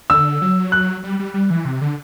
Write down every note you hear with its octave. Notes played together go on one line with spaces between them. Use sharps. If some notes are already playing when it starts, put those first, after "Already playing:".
D3 E6
F#3
F#6
G3
G3
G3
E3
C3
D3